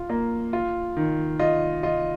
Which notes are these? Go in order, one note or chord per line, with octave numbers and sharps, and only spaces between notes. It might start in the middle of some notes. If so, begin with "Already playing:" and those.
Already playing: F4
A#3
F4
D#3
F4 D#5
F4 D#5